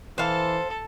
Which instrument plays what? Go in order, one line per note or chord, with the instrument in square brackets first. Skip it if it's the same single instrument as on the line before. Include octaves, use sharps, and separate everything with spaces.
[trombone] E3 [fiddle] A4 [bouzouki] C5 F5